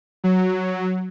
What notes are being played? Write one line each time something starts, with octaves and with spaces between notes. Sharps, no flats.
F#3